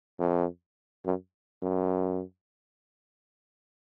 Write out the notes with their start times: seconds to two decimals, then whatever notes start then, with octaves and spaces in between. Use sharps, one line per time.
0.19 F2
1.05 F#2
1.62 F#2